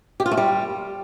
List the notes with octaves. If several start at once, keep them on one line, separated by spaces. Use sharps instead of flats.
G4
F4
A3
G3